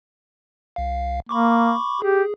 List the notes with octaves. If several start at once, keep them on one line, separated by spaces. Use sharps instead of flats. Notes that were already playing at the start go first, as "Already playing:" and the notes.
C2 F5
A#3 B5 C#6 D6
G4 G#4